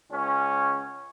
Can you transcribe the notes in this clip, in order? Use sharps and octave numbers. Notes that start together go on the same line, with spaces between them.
C#2 C#4